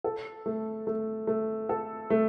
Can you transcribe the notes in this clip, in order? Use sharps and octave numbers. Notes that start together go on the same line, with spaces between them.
A4
A3
A3
A3
A4
A3